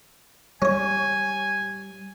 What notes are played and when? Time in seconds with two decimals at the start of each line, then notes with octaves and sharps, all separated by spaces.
0.62 G3 C#4 C#5 G#5